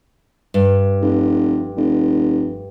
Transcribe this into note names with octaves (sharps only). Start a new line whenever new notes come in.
G2
F1
F1